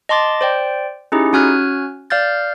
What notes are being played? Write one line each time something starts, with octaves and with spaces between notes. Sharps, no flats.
D#5 A5 C6 D6 A6
C5 D5 G5
C#4 D#4 E4 G4 G#4
C#4 F#4 G#5 F6 F#6 G#6
D5 F5 F6 G6 A6